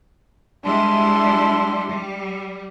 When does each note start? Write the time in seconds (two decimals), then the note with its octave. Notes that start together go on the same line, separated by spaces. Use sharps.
0.65 G3 G#3 D4 E4 C6
1.89 G3